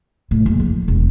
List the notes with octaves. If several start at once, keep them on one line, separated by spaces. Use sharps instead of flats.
A2
F#1
F2
E1